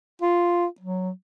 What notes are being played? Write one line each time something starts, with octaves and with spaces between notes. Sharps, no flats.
F4
F#3